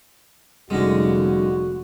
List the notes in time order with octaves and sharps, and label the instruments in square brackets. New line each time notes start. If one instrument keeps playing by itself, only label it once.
[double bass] F1 [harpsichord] D3 G#3 [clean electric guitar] G3 C#4 D#4 [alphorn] F#4